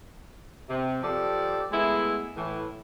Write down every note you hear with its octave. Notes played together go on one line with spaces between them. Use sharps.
C3
F3 G4 A4 D5
G#3 A3 B3 E4
A2 E3